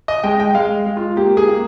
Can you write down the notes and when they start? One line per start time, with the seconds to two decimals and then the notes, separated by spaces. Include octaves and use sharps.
0.08 D#5
0.24 G#3 G5
0.40 G5
0.55 G#3 F5
0.86 G#3
0.97 F4
1.16 A#3 G4
1.37 G#4
1.48 A#3